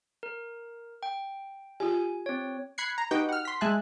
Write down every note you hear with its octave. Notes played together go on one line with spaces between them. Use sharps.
A#4
G5
F4 G4 G#5
C4 C#5
B5 F#6 G#6 C7 C#7
A#5
D#4 F#4 G4 B4 G5
F#5 F6
C6 B6
G#3 E5 G#5 A5 F#6